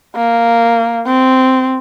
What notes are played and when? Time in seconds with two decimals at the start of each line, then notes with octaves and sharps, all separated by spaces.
0.16 A#3
1.06 C4